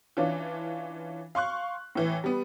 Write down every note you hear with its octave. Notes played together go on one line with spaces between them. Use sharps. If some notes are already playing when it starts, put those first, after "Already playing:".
E3 C#4 D4 F4
F5 C6 C#6 F#6
A2 E3
G3 B3